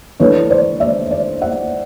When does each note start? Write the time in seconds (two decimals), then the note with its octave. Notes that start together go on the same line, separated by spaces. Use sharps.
0.20 E3 A3 D4 B4 C#5
0.50 C5 D5
0.80 D5 E5
1.10 D5 E5
1.41 E5 F#5